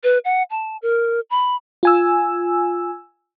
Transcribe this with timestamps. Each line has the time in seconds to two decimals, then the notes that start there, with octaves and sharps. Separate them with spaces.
0.04 B4
0.25 F#5
0.51 A5
0.82 A#4
1.30 B5
1.83 F4 G#5 E6